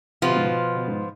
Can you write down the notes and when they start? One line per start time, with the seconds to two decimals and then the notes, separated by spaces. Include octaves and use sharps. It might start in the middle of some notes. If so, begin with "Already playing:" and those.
0.22 C3 F3 B3 F4
0.29 B2
0.37 G#2
0.44 B2
0.75 B2
0.88 G#2